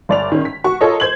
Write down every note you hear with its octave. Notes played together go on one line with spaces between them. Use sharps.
G1 D5 F7
D#3 C#4
B6
F#4 C#6
F4 A4 A#4 C#5 D#5
C5 G#6 F#7